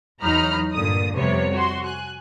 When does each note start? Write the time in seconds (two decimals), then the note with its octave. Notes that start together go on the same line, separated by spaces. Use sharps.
0.21 E2 F#3 D#4 A#5 B5 F6
0.74 G2 A#2 D3 D#6
1.14 F2 C3 G3 B3 C#5
1.54 F#4 C6
1.84 G#5 F#6